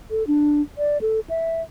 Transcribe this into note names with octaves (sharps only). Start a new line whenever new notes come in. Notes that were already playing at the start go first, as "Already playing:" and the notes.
A4
D4
D5
A4
E5